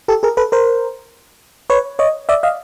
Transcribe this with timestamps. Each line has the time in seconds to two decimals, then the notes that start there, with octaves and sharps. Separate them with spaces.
0.08 G4 A4
0.23 G#4 A#4
0.37 A4 B4
0.52 A#4 C5
1.70 B4 C#5
1.99 C#5 D#5
2.29 D5 E5
2.43 D#5 F5